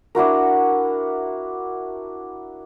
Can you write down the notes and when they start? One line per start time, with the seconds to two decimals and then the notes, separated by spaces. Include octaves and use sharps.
0.15 D4 E4 F#4 A#4